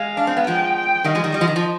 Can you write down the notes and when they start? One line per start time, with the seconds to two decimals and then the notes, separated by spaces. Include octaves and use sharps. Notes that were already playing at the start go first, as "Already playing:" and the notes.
Already playing: G#3 F5
0.17 D4
0.27 C4
0.37 B3
0.47 F3 G#3 G5
0.76 G5
1.04 D#3 G3 D#5
1.15 F3 G#3
1.24 D#3 G3
1.34 G3 D#5
1.41 F3
1.48 D#3
1.56 F3